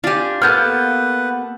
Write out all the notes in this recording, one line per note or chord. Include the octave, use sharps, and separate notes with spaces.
D4 F4 G4 G#5
A#3 B3 A4 B4 F#5 F6 G6